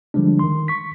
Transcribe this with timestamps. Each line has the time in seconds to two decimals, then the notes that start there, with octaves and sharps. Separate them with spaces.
0.14 D3 F3 G3 G#3 D4
0.39 D#3 C6
0.68 C#6 B6